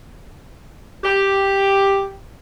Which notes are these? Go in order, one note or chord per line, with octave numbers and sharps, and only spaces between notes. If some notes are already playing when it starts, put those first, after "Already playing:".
G4